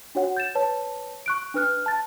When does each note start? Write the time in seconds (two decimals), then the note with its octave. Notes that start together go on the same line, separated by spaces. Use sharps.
0.15 D4 F#4 C#5 F#5
0.37 G6 A6 E7
0.55 B4 C#5 A5
1.26 C#6 F#6 D7
1.54 D4 B4 F6 F#6
1.86 A5 A6